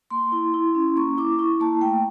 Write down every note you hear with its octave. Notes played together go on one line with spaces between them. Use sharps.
A#3 C6
E4
E4
C#4
A#3 C#6
E4 D6
E4 C#6
A#3 A5
A3 G5